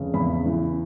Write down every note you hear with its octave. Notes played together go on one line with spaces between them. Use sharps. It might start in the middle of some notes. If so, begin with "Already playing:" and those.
Already playing: F1 C#3
E2 B5
E3